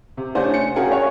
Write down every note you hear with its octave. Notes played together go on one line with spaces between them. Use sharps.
C3
A3 C#4 D4 C5 G#5
C#7
C#4 F#4 G#4 A#4 F5 G5
C#5